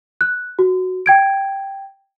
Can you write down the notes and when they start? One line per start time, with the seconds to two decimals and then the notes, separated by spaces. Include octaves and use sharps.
0.21 F#6
0.59 F#4
1.06 G5 G#6 D7